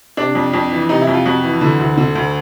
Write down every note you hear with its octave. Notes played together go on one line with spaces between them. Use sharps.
C3 D4
F2
F2
E3
C3 D#4
E4
F2
F4
F2 F#4
E3
D3
D2
D3
D2